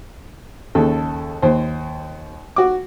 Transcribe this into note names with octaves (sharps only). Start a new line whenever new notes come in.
D#2 C#3 A4
D#2 C5
F#4 D6